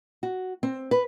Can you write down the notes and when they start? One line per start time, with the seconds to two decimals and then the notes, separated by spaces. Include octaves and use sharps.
0.23 F#4
0.63 C4
0.91 B4